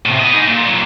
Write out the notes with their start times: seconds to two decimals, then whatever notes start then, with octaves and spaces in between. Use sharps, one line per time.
0.06 A2 C3
0.19 B3 D#5
0.34 D#4 G#4
0.47 A#2
0.63 A#2 F#3